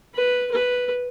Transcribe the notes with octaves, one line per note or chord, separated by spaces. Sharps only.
B4
B4